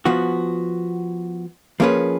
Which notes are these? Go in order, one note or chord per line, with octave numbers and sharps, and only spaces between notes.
F3 B3 F#4
F3 A#3 C#4 G#4 B4